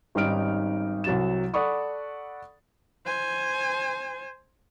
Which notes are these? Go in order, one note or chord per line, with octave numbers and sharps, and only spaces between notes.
G#1 G3 C#4 D#4 F6 D7
C2 F#3 F#4 A6 E7
A4 D5 F#5 B5 C#6 D#6
C5 G#5